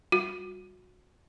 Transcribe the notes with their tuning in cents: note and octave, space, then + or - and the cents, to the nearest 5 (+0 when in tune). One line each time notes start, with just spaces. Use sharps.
G3 +0 F#4 -30